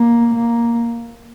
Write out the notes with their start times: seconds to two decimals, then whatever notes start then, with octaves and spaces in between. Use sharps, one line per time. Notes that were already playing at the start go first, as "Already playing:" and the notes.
Already playing: A#3
0.35 A#3